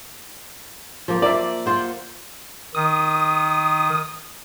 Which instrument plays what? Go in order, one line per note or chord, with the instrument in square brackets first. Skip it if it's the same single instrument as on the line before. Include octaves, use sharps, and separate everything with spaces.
[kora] F3 A#3
[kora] A#3 [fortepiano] D5 E5
[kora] F4 C5 F#5
[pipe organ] D#3 [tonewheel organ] D#6